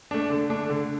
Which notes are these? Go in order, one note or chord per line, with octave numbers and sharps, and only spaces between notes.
A3 D4
D3
A3 D4
D3